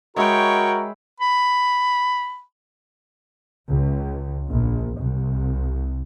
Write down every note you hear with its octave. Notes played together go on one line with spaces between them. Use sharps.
G#3 F#4 A#4 C#5 E5 G5 B5
B5
C#2
A#1
C2